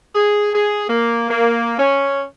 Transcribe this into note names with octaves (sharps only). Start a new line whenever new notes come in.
G#4
G#4
A#3
A#3
C#4